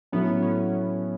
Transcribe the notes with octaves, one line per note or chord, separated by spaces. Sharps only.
A2 F#3 A3 B3 C#4
C#4